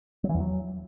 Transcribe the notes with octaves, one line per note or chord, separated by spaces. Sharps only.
F#3
E3
E2
F#3